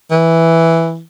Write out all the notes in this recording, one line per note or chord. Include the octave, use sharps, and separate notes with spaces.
E3